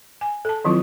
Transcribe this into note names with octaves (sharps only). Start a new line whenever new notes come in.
G#5
A4 A5
D#3 F3 F#3 C4 E4 F4